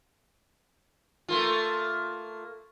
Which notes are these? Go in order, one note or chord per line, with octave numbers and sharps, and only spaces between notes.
A3 A#3 F4